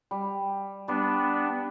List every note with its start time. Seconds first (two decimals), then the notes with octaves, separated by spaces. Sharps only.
0.11 G3
0.88 G3 B3 D4